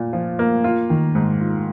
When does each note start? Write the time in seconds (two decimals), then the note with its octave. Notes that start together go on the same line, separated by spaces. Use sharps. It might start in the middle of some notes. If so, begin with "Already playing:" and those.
Already playing: A#2
0.13 F3
0.39 A#3
0.64 F4
0.90 D#3
1.15 G#2
1.40 F4